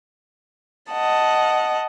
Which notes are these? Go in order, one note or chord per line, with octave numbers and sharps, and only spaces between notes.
D#5 F#5 A5